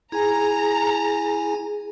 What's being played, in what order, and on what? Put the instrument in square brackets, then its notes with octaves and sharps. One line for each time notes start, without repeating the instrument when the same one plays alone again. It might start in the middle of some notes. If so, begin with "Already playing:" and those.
[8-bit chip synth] E4 G#5 [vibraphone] G#4 [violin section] A#5